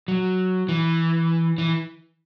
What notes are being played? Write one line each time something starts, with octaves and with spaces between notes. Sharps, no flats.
F#3
E3
E3